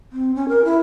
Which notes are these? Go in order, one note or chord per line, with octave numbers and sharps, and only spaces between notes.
C4
C#4
A#4
E4